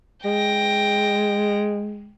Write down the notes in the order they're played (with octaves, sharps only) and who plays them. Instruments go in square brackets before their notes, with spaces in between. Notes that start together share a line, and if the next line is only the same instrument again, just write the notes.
[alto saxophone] G#3 [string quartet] G5 A#6